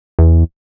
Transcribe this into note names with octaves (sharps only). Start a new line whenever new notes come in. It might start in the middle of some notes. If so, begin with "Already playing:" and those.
E2